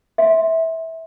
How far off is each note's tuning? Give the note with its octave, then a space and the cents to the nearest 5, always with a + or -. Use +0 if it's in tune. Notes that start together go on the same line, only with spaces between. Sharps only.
E5 -20 C6 +0